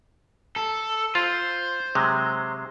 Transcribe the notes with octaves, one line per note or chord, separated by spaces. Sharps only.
A4
F4 C5
C3 F#3 G#3